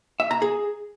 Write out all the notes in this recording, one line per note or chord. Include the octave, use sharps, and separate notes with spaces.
E5
A#5
G#4